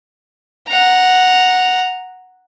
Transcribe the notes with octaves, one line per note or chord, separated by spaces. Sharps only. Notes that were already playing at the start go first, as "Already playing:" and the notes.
F#5 A#5